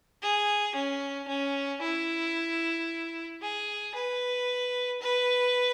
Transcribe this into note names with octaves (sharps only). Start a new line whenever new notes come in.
G#4
C#4
C#4
E4
G#4
B4
B4